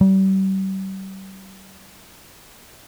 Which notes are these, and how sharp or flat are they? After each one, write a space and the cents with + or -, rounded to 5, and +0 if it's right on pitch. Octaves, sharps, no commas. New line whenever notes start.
G3 -35